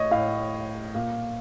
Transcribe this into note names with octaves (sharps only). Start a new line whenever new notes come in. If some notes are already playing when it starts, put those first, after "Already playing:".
Already playing: A2 C#5 D#5
A2 F5
A#2